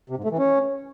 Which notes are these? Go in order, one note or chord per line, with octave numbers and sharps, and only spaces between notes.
C3
G#2
A3
E3
C#4